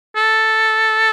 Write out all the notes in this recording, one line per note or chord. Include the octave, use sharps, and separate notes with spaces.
A4